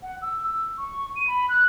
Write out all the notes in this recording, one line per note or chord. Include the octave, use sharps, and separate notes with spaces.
F#5
E6
E6
C#6
D#7
B5
F#6